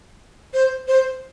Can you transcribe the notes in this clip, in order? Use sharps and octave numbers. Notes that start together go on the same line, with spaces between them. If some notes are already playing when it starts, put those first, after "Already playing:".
C5
C5